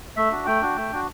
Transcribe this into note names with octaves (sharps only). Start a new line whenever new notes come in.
A3 E5
D4 F#4
A3 G5
D4 F#4
A3
D4 F#4